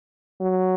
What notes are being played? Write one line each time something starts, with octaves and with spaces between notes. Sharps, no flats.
F#3